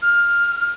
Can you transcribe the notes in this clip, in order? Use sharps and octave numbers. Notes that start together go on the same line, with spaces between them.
F6